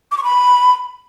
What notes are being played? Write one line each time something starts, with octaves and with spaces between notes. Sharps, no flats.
D6
C#6
B5